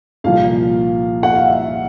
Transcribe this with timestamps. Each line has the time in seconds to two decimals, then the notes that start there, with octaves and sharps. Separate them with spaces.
0.24 C2 A#2 F3 F5
1.23 F#5
1.35 F5
1.47 E5